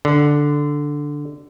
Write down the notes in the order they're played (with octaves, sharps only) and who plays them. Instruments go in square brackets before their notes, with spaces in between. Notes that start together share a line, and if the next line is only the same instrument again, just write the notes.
[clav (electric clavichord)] D3